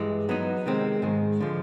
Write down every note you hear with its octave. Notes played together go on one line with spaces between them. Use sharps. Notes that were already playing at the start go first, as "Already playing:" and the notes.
Already playing: G2 E3 G#3
F#3 B3 D#4
C3 D#3 G#3 C4
G#2 D#3 G#3
D3 F3 G#3